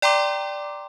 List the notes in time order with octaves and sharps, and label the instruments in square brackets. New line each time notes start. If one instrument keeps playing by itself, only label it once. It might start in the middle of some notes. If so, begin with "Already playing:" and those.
[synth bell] D5 G5 A#5 C6 D6